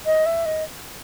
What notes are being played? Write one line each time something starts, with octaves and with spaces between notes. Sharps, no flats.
D#5
E5
D#5